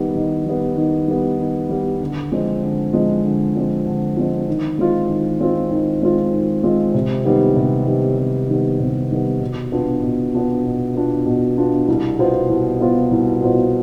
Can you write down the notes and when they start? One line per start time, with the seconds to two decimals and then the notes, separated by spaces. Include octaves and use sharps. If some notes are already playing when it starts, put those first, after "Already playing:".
Already playing: D#3 G3 B3
0.15 D#3
0.46 G3 B3
0.77 D#3
1.08 G3 B3
1.39 D#3
1.69 G3 B3
2.00 D3
2.32 F3 G#3 C4
2.63 D3
2.93 F3 G#3 C4
3.24 D3
3.55 F3 G#3 C4
3.86 D3
4.17 F3 G#3 C4
4.48 D#3
4.78 G#3 C4 F4
5.09 D#3
5.40 G#3 C4 F4
5.71 D#3
6.02 G#3 C4 F4
6.33 D#3
6.63 G#3 C4 F4
6.94 C3
7.25 D#3 G3 B3
7.56 C3
7.87 D#3 G3 B3
8.18 C3
8.49 D#3 G3 B3
8.79 C3
9.10 D#3 G3 B3
9.41 B2
9.72 B3 D4 F4
10.03 B2
10.34 B3 D4 F4
10.65 B2
10.96 B3 D4 F4
11.26 B2
11.57 B3 D4 F4
11.88 C2
12.19 B2 B3 F4 C5
12.49 C2
12.81 B2 B3 F4 C5
13.11 C2
13.42 B2 B3 F4 C5